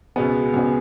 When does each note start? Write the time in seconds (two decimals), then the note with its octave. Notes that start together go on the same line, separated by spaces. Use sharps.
0.16 C#2 B2 G#3 B3
0.54 C#2 B2 G#3 B3